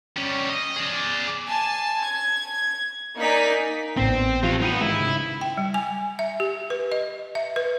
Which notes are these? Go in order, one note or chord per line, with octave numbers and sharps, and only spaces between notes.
G3 C#4
D#5
G#4 D5
G#5 A5
G#6
A#3 D#4 D5 G#5 B6
A1 A2 B3 C4
E3 F4 G4 F5
B3 D#4
G#2 D#3 G#3 E4
C#3 E7
G5
G3
G#5
E5
G4
B4
D#5
E5
B4